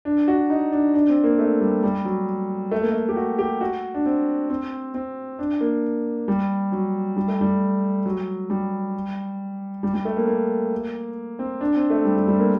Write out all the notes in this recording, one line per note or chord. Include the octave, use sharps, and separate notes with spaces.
D4
F#4
D#4
D4
D4
C4
A#3
A3
G3
G3
F#3
A3
A#3
A3
G4
F#4
G4
F#4
D4
C4
C4
C4
D4
A#3
G3
F#3
G3
A3
G3
F#3
G3
G3
G3
A3
A#3
A#3
C4
D4
C4
A3
G3
G3
G3
A#3